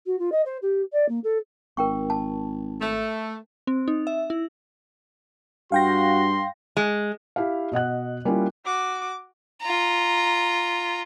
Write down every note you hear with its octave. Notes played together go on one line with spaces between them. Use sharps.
F#4
F4
D#5
C5
G4
D5
A#3
A4
G#1 A#4 G5 C#6
A5
A3
C4
D#4
E5
E4
G2 F#4 F5 G5 C6 A#6
G#3
E4 G4 F5
B2 D#5 F#5 F#6
G3 A#3 C#4 E4 F4
F#4 D6
F4 A#5